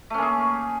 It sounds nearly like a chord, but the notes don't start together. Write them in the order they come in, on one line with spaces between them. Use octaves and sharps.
A3 C#4 A#3 G#4